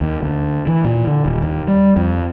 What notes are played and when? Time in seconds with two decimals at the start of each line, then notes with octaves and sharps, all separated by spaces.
0.01 D#2
0.23 D2
0.67 E3
0.84 A#2
1.07 D3
1.26 D#1
1.42 D#2
1.67 G3
1.96 F2